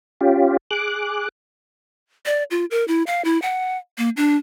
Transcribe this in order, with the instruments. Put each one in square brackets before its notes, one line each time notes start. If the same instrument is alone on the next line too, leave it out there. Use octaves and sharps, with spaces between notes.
[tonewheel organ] C#4 F4 G4
G#4 D6 F#6
[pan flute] D5
F4
A#4
E4
F5
E4
F#5
A#3
D4